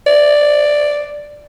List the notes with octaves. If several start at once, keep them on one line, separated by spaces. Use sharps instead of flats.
D5